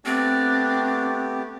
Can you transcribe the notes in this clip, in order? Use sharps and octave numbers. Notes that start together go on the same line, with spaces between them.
A3 B3 C4 D4 G4